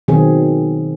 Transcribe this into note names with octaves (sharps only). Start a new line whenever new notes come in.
B2 D#3 F#3 C4 G#4